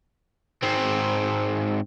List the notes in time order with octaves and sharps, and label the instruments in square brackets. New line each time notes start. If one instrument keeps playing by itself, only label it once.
[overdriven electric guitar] G#2 C4